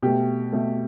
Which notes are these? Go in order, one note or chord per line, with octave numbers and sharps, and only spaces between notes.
B2 A3 G4
B2 A3